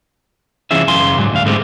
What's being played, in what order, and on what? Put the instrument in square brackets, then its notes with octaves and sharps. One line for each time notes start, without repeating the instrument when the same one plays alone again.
[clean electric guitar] C2 E3 C#4 F4 G#4 E5
F#2 C#3 F5 G#5 C6
C#2 G#2 D#3 F#3
D2 F5
G#2 D3 G#3 A3 C4 G4